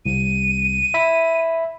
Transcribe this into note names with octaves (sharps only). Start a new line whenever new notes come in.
C2 D#7
E5 B5 B6